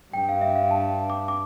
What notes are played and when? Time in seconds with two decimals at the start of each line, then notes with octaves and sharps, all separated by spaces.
0.13 G2 G5
0.29 F5
0.41 E5
0.56 F5
0.71 A5
1.10 D6
1.28 D6